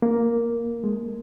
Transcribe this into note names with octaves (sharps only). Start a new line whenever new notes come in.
A#3
G#3